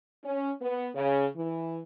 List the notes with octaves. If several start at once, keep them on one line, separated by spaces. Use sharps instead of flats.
C#4
B3
C#3
E3